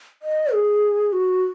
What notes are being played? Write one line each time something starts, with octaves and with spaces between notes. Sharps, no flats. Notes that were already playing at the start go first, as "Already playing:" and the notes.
D#5
G#4
F#4